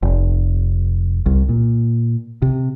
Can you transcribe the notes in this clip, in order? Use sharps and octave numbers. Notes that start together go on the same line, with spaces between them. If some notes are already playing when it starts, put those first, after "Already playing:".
F1
C2
A#2
C3